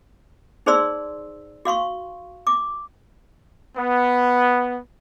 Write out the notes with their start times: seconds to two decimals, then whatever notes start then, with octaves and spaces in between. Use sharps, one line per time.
0.66 D#4 G#4 C5 D5 C6 E6
1.65 F#4 F5 C6 C#6
2.47 D6
3.77 B3